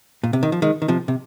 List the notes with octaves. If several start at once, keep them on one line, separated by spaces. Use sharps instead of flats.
A#2
C3
D#3
F3
D#3 G#3
D#3
C3 F3
C3